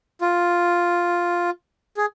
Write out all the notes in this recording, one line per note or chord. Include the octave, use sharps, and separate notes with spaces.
F4
G#4